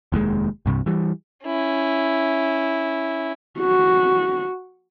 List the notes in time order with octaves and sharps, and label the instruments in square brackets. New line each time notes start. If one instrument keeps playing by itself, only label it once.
[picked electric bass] F1 D#2 G#2 G#3
C2 G2 C3
E3 G3
[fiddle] C#4 E4
[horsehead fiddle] F#4